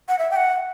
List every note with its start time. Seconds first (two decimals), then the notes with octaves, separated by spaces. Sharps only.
0.09 F#5
0.19 E5
0.31 G5
0.36 F#5